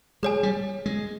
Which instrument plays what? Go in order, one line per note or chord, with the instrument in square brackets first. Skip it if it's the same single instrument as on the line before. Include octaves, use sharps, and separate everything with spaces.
[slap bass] G#3 [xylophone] G#4 C#5 G#5
[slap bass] G3
G#3